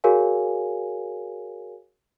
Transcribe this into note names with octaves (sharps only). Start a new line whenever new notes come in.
F#4 G#4 A#4 C#5 F5 G#5